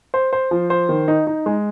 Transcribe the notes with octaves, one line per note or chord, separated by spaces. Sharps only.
C5
C5
F3
C5
D#3
D#4
D#4
G#3